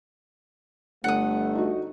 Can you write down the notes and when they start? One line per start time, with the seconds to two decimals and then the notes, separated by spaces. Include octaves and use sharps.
1.04 G1 A3 F#5 D#6
1.55 D#4 F#4